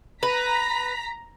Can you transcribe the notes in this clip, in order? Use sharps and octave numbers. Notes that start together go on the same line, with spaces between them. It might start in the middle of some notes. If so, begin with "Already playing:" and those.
B4 A#5 B6